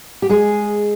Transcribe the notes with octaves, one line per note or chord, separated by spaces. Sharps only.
G4
G#3 G#4